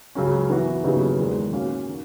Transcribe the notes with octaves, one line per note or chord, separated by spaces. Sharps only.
C#2 C#3 F#3 C#4
E3 B3 F#4
D#2 C#3 F#3 B3 D#4
E2 D#3 G#3
A#2 A#3 C#4 F#4
D#3